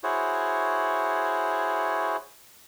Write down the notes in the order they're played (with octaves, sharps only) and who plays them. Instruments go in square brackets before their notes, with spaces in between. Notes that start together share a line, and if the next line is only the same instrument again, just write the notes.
[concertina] E4 F#4 G#4 C5 C#5